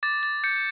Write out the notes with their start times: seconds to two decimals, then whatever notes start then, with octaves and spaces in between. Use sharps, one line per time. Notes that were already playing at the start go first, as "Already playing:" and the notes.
0.03 D6 A6
0.23 A6
0.44 G6 C#7